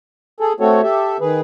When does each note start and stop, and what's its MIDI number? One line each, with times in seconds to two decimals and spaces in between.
0.40 0.53 68
0.40 0.53 69
0.60 0.81 57
0.60 0.81 60
0.60 0.81 66
0.60 0.81 69
0.60 0.81 73
0.83 1.17 67
0.83 1.17 69
0.83 1.17 76
1.21 1.41 51
1.21 1.41 68
1.21 1.41 71